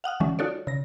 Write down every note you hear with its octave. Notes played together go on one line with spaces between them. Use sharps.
F5 F#5 D#6 F6
D3 E3 F#3 G#3 C#4
D#4 F4 F#4 A4 C#5 D5
C#3 A#6